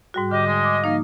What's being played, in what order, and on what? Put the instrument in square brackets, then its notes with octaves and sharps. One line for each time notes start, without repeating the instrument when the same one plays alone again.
[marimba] G#2 G3 F#4
[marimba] D3 [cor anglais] G4 [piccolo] D#5
[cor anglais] G#3
[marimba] D6
[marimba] F3 A#3 D#4 [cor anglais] F5